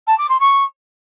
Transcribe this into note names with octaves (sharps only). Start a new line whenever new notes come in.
A5
D6
C6
C#6